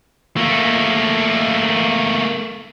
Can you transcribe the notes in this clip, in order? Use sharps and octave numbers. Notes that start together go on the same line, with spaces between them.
A3 A#3